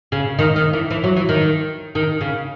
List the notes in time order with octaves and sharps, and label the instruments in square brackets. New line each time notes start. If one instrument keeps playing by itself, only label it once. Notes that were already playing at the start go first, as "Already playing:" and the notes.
[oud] C#3
D#3
D#3
E3
E3
F#3
E3
D#3
D#3
C#3